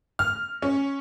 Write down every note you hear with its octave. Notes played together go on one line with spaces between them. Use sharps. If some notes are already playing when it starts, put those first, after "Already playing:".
F6
C#4